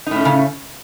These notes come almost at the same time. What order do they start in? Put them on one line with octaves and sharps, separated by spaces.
D#4 A2 C#4 A3 C#3